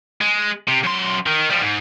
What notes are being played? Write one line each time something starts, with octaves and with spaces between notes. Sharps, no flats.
G#3
C3
F#2 C6
D#3
F3 G3
G#2